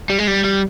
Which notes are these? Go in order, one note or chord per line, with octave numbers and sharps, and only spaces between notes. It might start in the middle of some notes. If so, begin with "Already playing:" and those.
G3
G#3
G3
G3